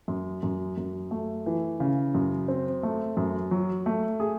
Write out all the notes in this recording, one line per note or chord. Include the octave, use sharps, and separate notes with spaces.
F#2
F#2
F#2
A3
E3
C#3
F#2
C4
A3
F#2
F#3
A3
G#4